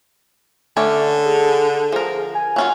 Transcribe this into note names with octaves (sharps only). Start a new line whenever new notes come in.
D3 A3 C#4 D5
G#4
F3 G#4 A#4
G#5
F#3 C#4 F4